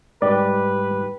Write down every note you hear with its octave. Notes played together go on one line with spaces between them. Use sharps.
G#2 G3 G4 B4 D5